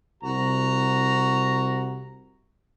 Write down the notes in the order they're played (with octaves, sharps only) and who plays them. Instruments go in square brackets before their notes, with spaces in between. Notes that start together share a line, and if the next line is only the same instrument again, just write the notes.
[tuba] C2 [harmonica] F#4 [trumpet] A#5